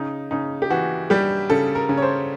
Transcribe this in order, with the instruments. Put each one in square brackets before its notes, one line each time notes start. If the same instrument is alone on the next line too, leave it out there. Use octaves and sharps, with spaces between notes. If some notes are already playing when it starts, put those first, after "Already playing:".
Already playing: [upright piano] C#3 D#4
C#3 D#4
G4
E3 F#4
G3 G4
C#3 A4
A#4
C#3
C#5
C5